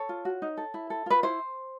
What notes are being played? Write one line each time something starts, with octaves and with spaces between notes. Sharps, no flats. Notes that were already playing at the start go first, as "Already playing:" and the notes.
Already playing: A4 C#5
F4
F#4
D#4
A4
E4
A4
F4 B4
E4 C5